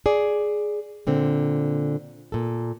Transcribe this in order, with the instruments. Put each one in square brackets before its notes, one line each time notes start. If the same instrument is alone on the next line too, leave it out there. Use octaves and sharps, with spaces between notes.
[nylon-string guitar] G#4 D5
A#2 D3 C4
A#2 A4